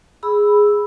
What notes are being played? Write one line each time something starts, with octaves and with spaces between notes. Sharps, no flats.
G#4 B5 E6